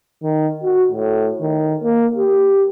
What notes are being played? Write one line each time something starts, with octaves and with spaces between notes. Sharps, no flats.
D#3
F#4
A2
D#3
A#3
G4